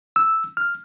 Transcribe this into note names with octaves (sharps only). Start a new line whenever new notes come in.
E6
F6